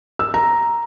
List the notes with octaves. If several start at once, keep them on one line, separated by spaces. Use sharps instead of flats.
E6
A#5